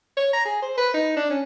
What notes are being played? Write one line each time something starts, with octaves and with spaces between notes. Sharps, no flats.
C#5
A#5
G#4
C5
B4
D#4
D4
C#4